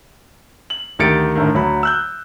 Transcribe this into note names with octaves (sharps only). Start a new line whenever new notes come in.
F#7
D2 D#3 G4 A6 C#7 D7
A2 D3 D#3
D2 F#3 B5
E6 F#6 G6